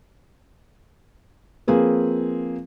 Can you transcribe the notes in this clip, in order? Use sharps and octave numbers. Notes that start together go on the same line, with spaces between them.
F3 A#3 C4 G#4 B4